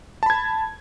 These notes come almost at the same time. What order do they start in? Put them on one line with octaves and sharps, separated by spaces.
A5 B5 G#6